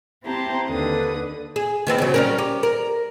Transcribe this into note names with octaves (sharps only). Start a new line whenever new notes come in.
C4 E4 G4 C5 A5 A#5
D#2 D3 B4 D#6
G#4
D#3 B3 C4
C#3 F#3
G3 C#4 A#4
G4
A#4